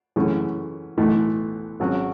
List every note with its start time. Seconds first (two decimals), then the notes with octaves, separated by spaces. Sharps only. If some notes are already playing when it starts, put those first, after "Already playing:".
0.16 F#2 C#3 E3 A3 C#4
0.97 B1 A2 E3 A3 D#4
1.80 G#1 G#2 F#3 C#4 F#4